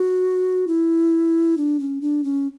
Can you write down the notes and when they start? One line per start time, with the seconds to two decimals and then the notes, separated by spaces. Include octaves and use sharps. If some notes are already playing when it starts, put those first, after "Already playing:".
Already playing: F#4
0.67 E4
1.57 D4
1.80 C#4
2.01 D4
2.24 C#4